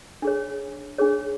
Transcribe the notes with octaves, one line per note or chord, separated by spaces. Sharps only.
D4 G#4 C#5
D4 G#4 C#5